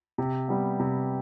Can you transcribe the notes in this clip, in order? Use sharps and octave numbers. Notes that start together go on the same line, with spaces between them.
C3
G3 B3
C3